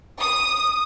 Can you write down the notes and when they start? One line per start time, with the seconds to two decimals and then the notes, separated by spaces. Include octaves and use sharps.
0.20 D#6